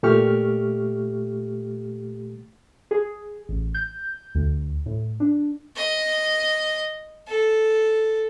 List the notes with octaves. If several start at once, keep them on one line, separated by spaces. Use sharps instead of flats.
A#2 A3 G4 C#6 F6
G#4
A1
G6
D2
A2
D4
D#5
A4